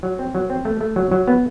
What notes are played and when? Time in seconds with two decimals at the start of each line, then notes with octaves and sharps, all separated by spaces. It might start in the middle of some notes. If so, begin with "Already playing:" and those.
0.03 F#3
0.19 C4
0.35 F#3
0.50 C4
0.65 A3
0.81 A3
0.96 F#3
1.12 F#3
1.28 B3